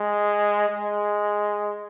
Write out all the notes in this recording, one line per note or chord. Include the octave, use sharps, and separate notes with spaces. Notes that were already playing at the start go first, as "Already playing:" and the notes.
Already playing: G#3
G#3